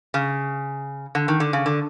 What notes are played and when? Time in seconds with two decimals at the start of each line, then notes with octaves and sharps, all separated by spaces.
0.14 C#3
1.15 D3
1.28 D#3
1.40 D3
1.53 C#3
1.66 D3